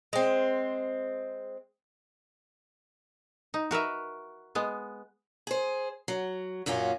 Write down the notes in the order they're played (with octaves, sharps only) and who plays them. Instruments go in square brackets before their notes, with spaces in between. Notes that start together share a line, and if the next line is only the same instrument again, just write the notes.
[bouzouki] G#3 C4
[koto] D#4
F#4 A#4 B4 E5
G#3 B3
[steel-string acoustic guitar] G#4 C5
F#3
F#2 A#2 C#4 F4 F#4